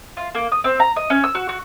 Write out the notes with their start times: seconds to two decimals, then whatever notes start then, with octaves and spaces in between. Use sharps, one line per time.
0.17 F4
0.35 A#3
0.52 D#6
0.64 C4
0.80 A#5
0.96 D#5
1.10 C#4
1.24 E6
1.35 F#4
1.49 F#4